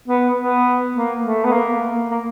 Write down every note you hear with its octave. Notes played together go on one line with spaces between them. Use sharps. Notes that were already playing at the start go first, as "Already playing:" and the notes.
B3
B3
A#3
A3
B3
A#3
A#3